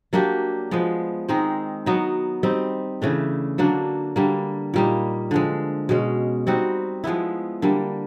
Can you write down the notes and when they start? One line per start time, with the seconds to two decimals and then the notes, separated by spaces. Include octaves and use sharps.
0.13 F#3 A#3 D4 G4
0.71 F3 G#3 B3
1.29 D#3 G#3 C4 D#4
1.86 F#3 B3 D#4
2.43 G3 C4 D#4
3.02 C#3 E3 A3 D4
3.58 D3 F#3 A#3 D4
4.16 D3 G3 A#3
4.74 A#2 G3 A#3 D#4
5.31 D3 F3 G#3
5.89 B2 G#3 C#4
6.47 G3 C4 D#4 F#4
7.04 F3 G#3 B3 E4
7.62 D3 G3 A#3